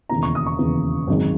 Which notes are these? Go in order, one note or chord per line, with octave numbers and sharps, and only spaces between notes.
E1 D#2 C#3 E3 B3 A#5
C#6
D#6
C#6
E1 D#2 C#3 E3 B3
G#1 F#2 D#3 G#3